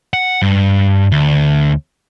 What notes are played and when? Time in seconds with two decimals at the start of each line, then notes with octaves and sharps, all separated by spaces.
0.13 F#5
0.42 G2
1.12 D2